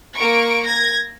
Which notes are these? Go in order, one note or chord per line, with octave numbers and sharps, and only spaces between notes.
A#3 A#4 C#6 D7
G#6 A#6